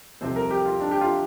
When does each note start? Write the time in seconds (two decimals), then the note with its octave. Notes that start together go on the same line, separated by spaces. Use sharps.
0.21 C2 C3 F3 C4 C5
0.36 A#4
0.51 G4
0.65 F4
0.80 D4
0.91 G4
1.01 F4